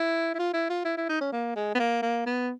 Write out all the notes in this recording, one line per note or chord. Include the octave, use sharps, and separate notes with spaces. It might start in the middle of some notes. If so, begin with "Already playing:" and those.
Already playing: E4
E4
F4
E4
F4
E4
E4
D#4
C#4
A#3
G#3
B3
A#3
A#3
B3